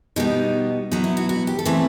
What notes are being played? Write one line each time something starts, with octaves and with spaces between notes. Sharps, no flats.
B2 G3 B3 D#4
B2 F#3 B3 D#4
E4
F#4
F#4
G4
A4
E3 A3 C4 B4